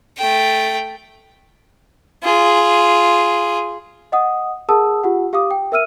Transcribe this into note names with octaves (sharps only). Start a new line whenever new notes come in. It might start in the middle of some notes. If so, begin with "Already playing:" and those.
A3 G5
F4 G#4
D#5 F#5 D#6
G#4 A#4 F#5 A5 D#6 E6
F4 G4 F#5
G4 F5 D6 D#6
G5
A#4 E5 E6 F6 D#7